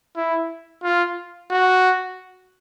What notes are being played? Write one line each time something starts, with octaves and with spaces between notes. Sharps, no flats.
E4
F4
F#4